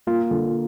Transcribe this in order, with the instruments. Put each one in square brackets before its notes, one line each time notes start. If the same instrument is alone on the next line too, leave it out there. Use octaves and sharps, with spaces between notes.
[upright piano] A#3 [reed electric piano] F4
[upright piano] D3